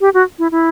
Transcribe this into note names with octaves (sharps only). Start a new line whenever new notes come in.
G4
F#4
E4
E4